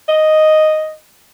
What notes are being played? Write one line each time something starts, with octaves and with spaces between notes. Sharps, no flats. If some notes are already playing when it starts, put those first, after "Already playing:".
D#5